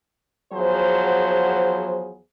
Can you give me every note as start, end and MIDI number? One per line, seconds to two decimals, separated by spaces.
0.53 2.17 40
0.53 2.17 53
0.53 2.17 54
0.53 2.17 68
0.53 2.17 72